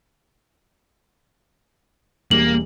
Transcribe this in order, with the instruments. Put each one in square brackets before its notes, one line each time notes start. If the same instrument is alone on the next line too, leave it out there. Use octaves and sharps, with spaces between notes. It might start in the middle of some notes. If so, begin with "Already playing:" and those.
[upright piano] E1 G3 F7 [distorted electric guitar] A#3 [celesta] F#7